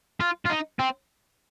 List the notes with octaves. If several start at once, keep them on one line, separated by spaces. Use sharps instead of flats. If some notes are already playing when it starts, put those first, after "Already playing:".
F4
F4
D#4
C4